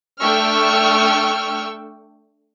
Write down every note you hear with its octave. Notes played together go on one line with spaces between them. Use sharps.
A3 D4 G5 C#6 E6 F6